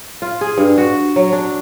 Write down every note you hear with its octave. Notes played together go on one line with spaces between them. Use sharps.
F4
G#4
G2
F#4
F#3
D4